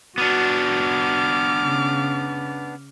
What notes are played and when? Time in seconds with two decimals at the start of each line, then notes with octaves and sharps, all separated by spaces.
0.18 B3 D4 F#4 D6 F6
1.63 C#3